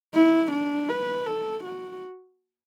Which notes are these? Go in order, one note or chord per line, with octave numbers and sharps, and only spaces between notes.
E4
D4
B4
A4
F#4